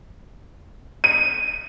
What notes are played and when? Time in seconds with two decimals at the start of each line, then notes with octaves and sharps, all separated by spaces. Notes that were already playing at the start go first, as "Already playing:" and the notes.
1.04 D#7